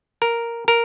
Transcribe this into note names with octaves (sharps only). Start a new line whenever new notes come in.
A#4
A#4